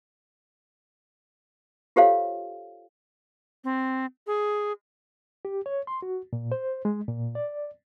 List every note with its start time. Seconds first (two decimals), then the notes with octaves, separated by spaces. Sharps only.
1.96 F4 G4 A4 C5 C#5 F5
3.64 C4
4.27 G#4
5.45 G4
5.66 C#5
5.87 C6
6.02 F#4
6.33 A#2
6.52 C5
6.85 G#3
7.08 A#2
7.35 D5